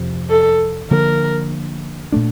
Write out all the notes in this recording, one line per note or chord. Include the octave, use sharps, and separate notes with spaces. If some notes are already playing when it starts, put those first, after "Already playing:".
Already playing: F2 C3 F3
A4
D3 F3 A#3 A#4
A#2 A3 D4